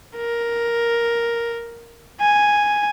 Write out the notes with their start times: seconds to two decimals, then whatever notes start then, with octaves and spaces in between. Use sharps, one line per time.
0.17 A#4
2.21 G#5